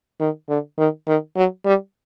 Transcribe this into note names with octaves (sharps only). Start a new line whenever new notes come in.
D#3
D3
D#3
D#3
F#3
G3